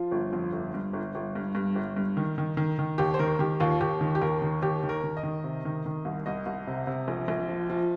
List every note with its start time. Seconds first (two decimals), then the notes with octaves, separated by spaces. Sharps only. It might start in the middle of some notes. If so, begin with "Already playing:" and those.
Already playing: F3 F4
0.11 G1
0.33 F2
0.52 G1
0.74 G2
0.93 G1
1.15 G1
1.35 G2
1.55 G2
1.76 G1
1.96 G2
2.17 D#3
2.38 D#3
2.57 D#3
2.79 D#3
2.98 D#2 G4
3.14 C5
3.19 D#3 A#4
3.39 D#3 G4
3.60 D#2 F4
3.80 D#2 G4
4.01 D#3
4.15 G4
4.21 D#2 A#4
4.42 D#3
4.62 D#2 G4
4.83 D#3
4.89 A#4
5.04 D#3
5.17 D#5
5.23 D#3
5.44 C3
5.65 D#3
5.86 D#3
6.05 C2
6.26 C2 D#5
6.46 C2
6.67 C3
6.87 C3
7.08 A#1
7.28 A#1
7.48 F3
7.70 F3